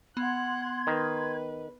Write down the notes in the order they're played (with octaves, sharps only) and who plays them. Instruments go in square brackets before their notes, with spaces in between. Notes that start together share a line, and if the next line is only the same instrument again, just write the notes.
[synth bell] B3 [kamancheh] F#5 F#6 [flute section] C6 G#6
[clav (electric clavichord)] D#3 [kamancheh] B4